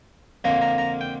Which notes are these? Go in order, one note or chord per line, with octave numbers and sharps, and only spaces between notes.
F2 D3 F3 A#3 A#5
A#5
A#5
G5